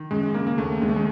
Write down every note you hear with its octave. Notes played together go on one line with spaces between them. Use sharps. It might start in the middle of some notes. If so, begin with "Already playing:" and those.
Already playing: D#3
F#2 G#3
G#3
C#3 A#3
A#3
D#2 A3
D#2 G#3
A3
G#3